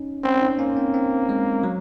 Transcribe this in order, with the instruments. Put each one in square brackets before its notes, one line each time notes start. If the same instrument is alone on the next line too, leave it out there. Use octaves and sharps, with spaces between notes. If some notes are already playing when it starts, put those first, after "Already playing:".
Already playing: [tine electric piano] C#4 D#4
[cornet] C4 [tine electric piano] C#4
[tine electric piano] D#4
[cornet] A#3 [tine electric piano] C#4
[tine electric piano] C4
C4
G#3
F#3